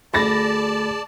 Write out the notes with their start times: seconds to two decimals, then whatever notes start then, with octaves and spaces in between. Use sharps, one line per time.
0.14 D2 G#4 D5 A5 B5 A6 A#6